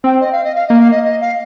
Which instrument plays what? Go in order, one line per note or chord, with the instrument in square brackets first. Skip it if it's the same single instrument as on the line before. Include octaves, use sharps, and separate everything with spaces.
[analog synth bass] C4 [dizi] G5
[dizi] D#5
F5
D#5
F5
[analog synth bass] A#3 [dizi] D#5
[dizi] F5
D#5
D#5
F5